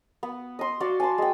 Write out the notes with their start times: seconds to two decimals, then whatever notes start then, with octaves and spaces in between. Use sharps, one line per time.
0.23 B3
0.59 D#5 C6
0.80 F#4 D5 F5
1.00 G#5 A5 C6
1.18 G#3 G5